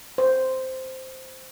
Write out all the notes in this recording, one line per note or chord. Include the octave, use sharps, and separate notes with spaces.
C5